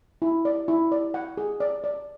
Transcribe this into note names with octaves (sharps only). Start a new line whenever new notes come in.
E4
D5
E4
D5
F#5
G#4
D5
D5